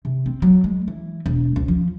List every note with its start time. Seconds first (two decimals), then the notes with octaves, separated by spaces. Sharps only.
0.05 C3
0.26 C4
0.42 F#3
0.64 G#3
0.88 E3
1.26 E1
1.56 C#2
1.68 F3